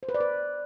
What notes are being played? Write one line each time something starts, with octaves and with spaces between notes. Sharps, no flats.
C5
B4
D5
B4